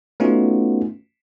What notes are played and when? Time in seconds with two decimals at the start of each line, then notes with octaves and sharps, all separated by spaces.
0.20 A3 B3 C#4 D#4 F4 F#4